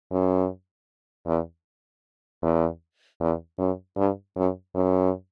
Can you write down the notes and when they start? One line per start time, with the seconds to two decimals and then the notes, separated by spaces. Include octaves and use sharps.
0.12 F#2
1.27 E2
2.42 E2
3.20 E2
3.58 F#2
3.97 G2
4.36 F#2
4.75 F#2